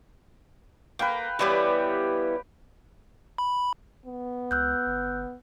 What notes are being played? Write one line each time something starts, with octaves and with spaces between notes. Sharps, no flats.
A#3 B4 F5 G5
E3 G3 B3 G4 B4 C#5
B5
B3
C#2 E6 F#6 G6
G1